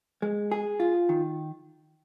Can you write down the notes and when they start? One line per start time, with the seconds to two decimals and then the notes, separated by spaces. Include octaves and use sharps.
0.22 G#3
0.51 G#4
0.80 F4
1.09 D#3